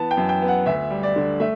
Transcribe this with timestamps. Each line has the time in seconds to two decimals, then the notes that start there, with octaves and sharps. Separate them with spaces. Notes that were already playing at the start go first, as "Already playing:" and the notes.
Already playing: E3 B3 A5
0.11 G5
0.17 F#2
0.29 G5
0.41 B3
0.48 F#5
0.66 D2 E5
0.90 G3
1.03 D5
1.16 D3
1.40 A3 E5